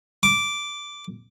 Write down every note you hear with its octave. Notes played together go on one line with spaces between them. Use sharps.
D6